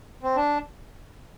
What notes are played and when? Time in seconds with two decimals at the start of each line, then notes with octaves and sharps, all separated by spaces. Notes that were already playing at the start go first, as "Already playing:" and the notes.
0.23 C4
0.36 D4